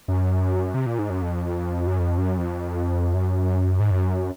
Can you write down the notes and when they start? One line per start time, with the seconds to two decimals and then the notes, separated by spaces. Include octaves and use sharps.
0.08 F#2
0.74 C3
0.86 A#2
0.99 G#2
1.10 F#2
1.22 F2
1.87 F#2
1.99 F2
2.18 F#2
2.38 F2
3.14 F#2
3.80 G#2
3.91 F#2